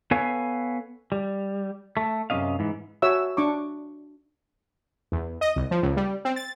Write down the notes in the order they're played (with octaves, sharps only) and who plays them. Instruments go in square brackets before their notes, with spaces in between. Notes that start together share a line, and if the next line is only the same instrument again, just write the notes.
[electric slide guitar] B3 A4 B4 C#5 F5 G#5
G3
A3
F#2 C3 C#4 D#5 F5
G#2 E3
[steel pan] F#4 C#5 E5 E6
D4 C#6 D6
[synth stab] E2
D#5
C2
F3
C#2
G3
C4
A6